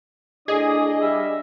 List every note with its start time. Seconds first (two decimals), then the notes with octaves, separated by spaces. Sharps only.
0.48 A2 D4 G#4 D5 D#5 D#6
1.02 G3 E5